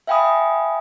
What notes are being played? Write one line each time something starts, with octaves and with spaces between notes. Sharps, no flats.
E5 F5 G5 G#5 B5 D#6